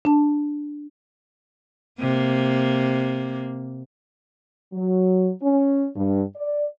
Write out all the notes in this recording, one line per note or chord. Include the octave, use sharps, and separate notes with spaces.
D4 A5
C3 A#3
F#3
C#4
G2
D5